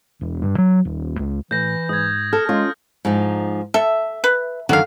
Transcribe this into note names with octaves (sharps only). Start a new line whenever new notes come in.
E1
G2
F#3
D#1
C#2
A2 E3 G6 A#6
G#2 D#6 G#6
A4 F6
G#3 C#4 F4
G#2 F3 D#4
A4 E5
B4
F#2 D3 D#3 F#4 F5